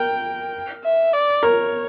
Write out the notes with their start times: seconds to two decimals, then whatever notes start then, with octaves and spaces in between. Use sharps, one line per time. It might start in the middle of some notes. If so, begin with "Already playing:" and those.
Already playing: A#4 G5
0.84 E5
1.13 D5
1.43 A#4 C#5